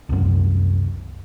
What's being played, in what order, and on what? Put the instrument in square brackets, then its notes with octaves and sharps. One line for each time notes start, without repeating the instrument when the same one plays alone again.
[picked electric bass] C2 F#2